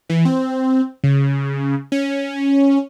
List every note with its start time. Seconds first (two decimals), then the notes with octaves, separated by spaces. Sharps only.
0.09 E3
0.25 C4
1.04 C#3
1.92 C#4